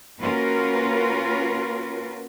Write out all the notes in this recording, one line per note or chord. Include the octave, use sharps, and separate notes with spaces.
A#3 C#4 F4 F#4 A#4 B4